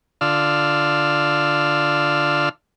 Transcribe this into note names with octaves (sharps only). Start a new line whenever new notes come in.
D3 F4 D5 E6 F6